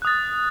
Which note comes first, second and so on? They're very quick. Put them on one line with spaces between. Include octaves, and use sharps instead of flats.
F#6 D#6 A6